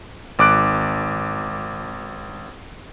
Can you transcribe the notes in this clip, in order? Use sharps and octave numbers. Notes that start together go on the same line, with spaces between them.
G#1 D6 F#6 D7